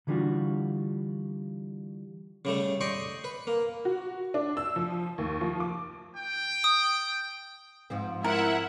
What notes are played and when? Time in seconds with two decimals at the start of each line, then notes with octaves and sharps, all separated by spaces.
0.07 D3 E3 G3 D4 F4 F#4
2.45 C#3 G3 A3
2.81 D5 D#5 G5 C6 C#6
3.24 B4
3.47 A#3
3.85 F#4
4.34 D4
4.57 E6
4.76 F3
5.18 D#2
5.41 F3
5.60 D6
6.16 G5
6.64 D#6
7.90 G#2 F3 C4
8.24 E4 A#4 E5 F#5